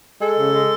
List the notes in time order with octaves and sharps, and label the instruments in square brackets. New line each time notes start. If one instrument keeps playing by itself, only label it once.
[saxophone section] G#3 A4
C#3
G#3